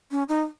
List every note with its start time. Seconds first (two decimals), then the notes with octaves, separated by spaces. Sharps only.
0.11 C#4
0.29 D#4